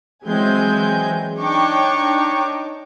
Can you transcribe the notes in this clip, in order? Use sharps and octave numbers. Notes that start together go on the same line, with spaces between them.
E3 F#3 G#3 C4 G#5 G6
D4 D#4 C#5 G5 C#6 D6